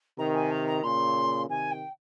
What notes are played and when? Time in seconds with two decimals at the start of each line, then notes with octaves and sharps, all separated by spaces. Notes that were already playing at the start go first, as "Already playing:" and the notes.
0.18 C3 D#3 A#5
0.35 G#5
0.51 A#5
0.67 A#5
0.83 A#2 C#3 C6
1.49 C3 D#3 G#5
1.71 G5